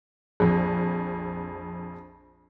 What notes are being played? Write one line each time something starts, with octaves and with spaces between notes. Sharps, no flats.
A#1 F2